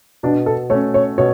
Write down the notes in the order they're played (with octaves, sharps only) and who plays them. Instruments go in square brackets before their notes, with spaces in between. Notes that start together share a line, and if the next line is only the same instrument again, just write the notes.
[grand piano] B2 [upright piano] D4
[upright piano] A4
[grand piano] A3 C#4 [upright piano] C#5
[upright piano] C#5
[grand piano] B2 [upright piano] C#5